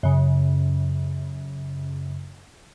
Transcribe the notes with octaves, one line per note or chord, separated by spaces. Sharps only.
F#2 C#3